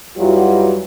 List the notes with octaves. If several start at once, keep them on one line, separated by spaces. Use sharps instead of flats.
E2 E3 F#3 G3 F4 F#4